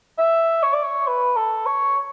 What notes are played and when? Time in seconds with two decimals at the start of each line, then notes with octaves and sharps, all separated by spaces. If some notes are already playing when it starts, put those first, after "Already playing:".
0.18 E5
0.63 C#5
0.73 D5
0.83 C#5
1.07 B4
1.36 A4
1.66 C#5